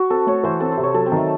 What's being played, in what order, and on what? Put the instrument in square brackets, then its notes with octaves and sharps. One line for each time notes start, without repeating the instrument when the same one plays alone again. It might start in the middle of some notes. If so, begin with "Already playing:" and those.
Already playing: [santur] F#4
[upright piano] C4 [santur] A4
[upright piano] A3 [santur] C#5
[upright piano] E3 [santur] C5
[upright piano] C4 [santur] A4
[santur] C5
[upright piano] C3
[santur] C#5
[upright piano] F#3 [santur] A4
[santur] C4
[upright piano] D#3 [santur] A3